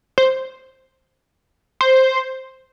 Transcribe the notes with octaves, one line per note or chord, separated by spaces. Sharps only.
C5
C5